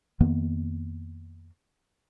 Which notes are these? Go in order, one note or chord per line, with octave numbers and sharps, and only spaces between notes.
F2 D#3 A#3 B3